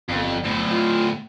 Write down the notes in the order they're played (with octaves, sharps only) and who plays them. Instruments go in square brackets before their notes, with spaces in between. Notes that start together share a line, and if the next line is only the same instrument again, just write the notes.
[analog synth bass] G1 [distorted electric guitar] F2
[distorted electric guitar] D2 A2
[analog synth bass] F4